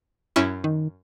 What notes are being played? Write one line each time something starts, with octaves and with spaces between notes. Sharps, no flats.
F#2 C#4 E4
D#3